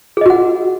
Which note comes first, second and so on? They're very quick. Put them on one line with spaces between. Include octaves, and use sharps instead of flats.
G#4 D#5 F#4 F#5